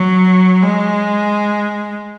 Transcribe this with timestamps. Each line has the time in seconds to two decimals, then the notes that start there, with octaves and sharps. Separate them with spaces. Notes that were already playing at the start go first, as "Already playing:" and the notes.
Already playing: F#3
0.62 G#3